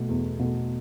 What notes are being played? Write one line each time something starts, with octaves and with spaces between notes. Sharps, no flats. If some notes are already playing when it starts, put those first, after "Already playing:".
Already playing: B2 A3
E2
B2 A3